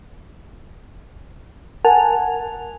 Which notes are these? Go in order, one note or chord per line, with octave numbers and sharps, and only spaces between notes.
A#4 F#5 G#5 A5